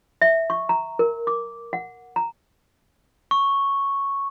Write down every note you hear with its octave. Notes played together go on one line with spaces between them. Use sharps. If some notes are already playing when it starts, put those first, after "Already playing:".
E5
C#6
A#5
A#4
D6
F#5
A#5
C#6